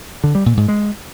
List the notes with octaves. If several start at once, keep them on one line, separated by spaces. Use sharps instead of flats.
D3
G3
A#2
G#2
G#3